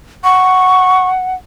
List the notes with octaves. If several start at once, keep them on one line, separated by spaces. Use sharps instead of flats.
F#5 C#6